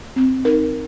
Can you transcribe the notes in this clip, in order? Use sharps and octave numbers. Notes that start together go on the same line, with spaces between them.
C4
D#4 A#4